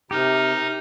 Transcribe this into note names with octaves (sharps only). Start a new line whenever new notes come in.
C3 D#4 G4 A#4